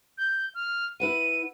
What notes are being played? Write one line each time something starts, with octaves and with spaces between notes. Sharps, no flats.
G6
F6
E4 B4 F#5 D#7